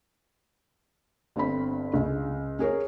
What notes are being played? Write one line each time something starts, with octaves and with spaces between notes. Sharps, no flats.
G1 G2 C4 B5
C#2
C#4 G#4 A#4 C#5